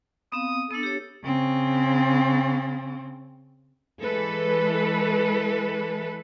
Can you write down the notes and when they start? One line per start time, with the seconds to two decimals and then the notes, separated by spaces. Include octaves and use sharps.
0.32 B3 C4 F5 D#6
0.71 B3 D4 A4
0.83 G4 C#5
1.24 C#3 C4
4.02 E3 G#3 A4 B4